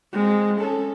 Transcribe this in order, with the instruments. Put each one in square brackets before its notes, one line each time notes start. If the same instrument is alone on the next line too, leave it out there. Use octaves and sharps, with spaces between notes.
[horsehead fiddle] G#3 C4
C#4 A4